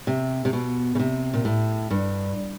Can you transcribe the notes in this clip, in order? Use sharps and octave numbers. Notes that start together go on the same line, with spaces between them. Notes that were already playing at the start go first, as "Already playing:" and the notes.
C3
C3
B2
C#3
C3
A#2
A2
G2